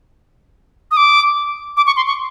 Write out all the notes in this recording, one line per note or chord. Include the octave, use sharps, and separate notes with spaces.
D#6
D6
D6
C#6
C6
C#6